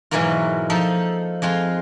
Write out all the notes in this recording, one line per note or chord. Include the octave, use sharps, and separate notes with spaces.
G#2 B2 E3 F#3 A#3 F4
F3 D#4 A4
F2 G#3 F4 C6